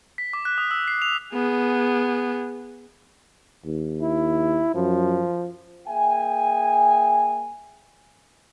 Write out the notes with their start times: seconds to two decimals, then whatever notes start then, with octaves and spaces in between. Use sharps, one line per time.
0.18 B6
0.33 D6
0.45 F#6
0.58 D#6
0.71 E6
0.88 C7
1.02 F7
1.34 B3 G#4
3.65 D#2
4.02 E4
4.75 F#2 F3
5.88 A#3 G#4 E5 G5 G#5